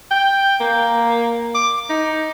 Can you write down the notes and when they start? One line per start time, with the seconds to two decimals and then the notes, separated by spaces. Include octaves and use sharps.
0.11 G5
0.60 A#3
1.55 D6
1.90 D#4